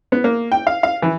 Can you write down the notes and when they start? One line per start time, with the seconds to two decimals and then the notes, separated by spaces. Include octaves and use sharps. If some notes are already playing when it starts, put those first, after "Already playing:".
0.12 B3
0.24 A#3
0.52 G5
0.67 F5
0.83 F5
1.02 E3